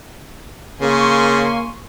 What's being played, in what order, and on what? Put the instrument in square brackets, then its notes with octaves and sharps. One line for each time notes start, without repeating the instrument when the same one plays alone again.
[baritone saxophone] C#3 [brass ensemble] A#3 [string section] G#5 C6 C#6